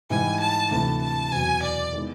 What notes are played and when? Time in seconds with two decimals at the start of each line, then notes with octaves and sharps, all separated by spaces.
0.10 G#2 E3 G3 G#5
0.40 A5
0.71 D2 C3 E3 A3 A5
1.02 A5
1.32 E2 B2 F#3 G#5
1.63 D5
1.93 D#3 G#3 B3 E4